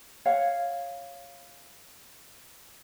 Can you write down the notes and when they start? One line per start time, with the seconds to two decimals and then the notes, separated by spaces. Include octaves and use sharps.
0.25 C#5 F5 F#5